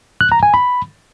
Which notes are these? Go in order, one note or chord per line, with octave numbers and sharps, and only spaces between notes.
F#6
A#5
G#5
B5